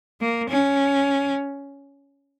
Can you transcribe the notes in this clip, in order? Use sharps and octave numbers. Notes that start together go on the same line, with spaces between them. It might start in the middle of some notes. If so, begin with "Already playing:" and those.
A#3
C#4